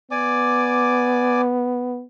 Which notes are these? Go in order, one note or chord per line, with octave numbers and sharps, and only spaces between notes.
B3 D5 G#5 D6